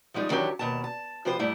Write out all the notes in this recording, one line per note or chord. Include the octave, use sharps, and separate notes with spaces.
F3 G3 G#3 D#4
D#3 E3 F#3 D4 G4 C#5
D#2 B2 A5
A5
C3 F3 B3 G4 C5
G#2 G3 A3 E4